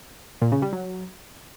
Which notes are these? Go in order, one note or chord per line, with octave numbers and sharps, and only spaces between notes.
A#2
C#3
G3
F#3